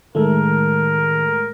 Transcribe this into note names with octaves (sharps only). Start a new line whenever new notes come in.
A2 D#3 G#3 A3 A4 A#4